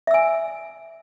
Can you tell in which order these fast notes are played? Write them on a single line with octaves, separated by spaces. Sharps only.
E5 E6 G#5